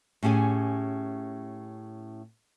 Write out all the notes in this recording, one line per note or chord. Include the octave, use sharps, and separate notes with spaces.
A2 C#4 G4 G#4 G#5